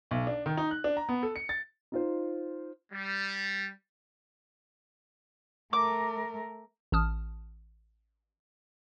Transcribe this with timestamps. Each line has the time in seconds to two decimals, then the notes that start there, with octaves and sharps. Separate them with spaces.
0.11 B1
0.27 D4
0.46 D#3
0.57 D#4
0.71 F#6
0.84 D4
0.97 A#5
1.09 B3
1.23 A4
1.36 C#7
1.49 A6
1.92 D#4 F4 C5
2.92 G3
5.73 A3 A#4 D6
6.92 A1 A5 D#6 F6